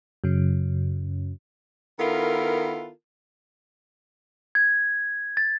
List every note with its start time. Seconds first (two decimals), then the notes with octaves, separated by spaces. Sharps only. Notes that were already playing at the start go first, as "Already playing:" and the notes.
0.24 F#2 C#3
1.99 D#3 B3 E4 F4 A4 A#4
4.55 G#6
5.37 A6